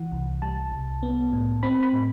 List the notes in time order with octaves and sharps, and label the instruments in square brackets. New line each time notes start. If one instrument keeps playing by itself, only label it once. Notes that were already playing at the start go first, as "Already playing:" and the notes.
Already playing: [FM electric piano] E3 F#5
C2
G3 A5
C2
B3
A2
C4 B5
B5
A2